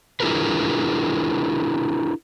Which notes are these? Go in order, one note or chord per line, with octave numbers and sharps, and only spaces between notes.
D4 E4 F4 G#4 A#4 B4